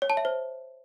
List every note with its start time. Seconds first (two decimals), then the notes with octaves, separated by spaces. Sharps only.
0.02 C#5
0.10 A5
0.17 E5
0.25 C5